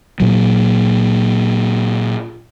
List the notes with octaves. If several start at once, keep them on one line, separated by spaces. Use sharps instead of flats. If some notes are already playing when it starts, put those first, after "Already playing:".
A#2 F#3